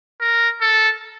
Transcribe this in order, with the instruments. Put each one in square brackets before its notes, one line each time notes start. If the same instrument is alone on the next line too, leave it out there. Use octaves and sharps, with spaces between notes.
[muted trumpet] A#4
A4